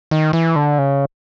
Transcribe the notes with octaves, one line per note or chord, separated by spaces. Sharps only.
D#3
E3
D3
C#3